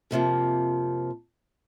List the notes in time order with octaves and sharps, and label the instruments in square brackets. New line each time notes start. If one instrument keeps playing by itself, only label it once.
[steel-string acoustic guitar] F2 C3 F3 A#3